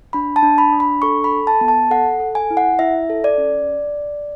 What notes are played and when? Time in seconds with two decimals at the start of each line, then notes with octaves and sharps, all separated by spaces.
0.13 D4 B5
0.36 A5
0.43 D4
0.58 B5
0.72 D4
0.80 B5
1.02 A4 C#6
1.24 B5
1.32 A4
1.47 A5
1.61 B3
1.68 A5
1.91 A4 F#5
2.20 A4
2.35 G#5
2.51 E4
2.57 F#5
2.79 E4 E5
3.10 A4
3.24 D5
3.38 C#4